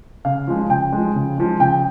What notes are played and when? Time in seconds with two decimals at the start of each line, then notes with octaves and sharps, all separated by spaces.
0.25 C#3 F5
0.47 F3 G#3
0.69 C#3 G5
0.92 F3 G#3
1.15 C#3
1.38 F3 G#3
1.60 C#3 G5